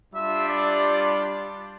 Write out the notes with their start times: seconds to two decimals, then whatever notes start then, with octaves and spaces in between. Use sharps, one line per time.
0.13 G3 D4 F4 E5
0.49 D5